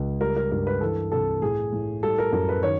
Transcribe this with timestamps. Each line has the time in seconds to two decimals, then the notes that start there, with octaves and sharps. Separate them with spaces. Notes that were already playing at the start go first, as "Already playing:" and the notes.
Already playing: C#2
0.20 G3 A#4
0.37 A#4
0.52 G2 A#4
0.67 B4
0.81 E3 A4
1.12 C2 A4
1.42 A2 G#4
1.72 A2
2.03 G3 A4
2.18 A#4
2.32 F#2 A#4
2.49 B4
2.63 D#3 C#5